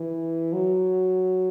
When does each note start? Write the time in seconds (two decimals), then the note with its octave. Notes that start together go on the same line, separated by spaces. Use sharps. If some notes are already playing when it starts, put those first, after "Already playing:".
Already playing: E3
0.53 F#3